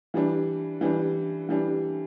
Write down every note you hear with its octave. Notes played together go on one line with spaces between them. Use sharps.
E3 G3 D4
E3 G3 D4
E3 G3 D4